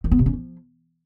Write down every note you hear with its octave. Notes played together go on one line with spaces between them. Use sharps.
D#3
B3
C3
C#4
F3